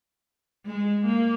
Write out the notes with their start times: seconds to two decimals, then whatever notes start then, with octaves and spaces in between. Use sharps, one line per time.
0.66 G#3
1.06 A#3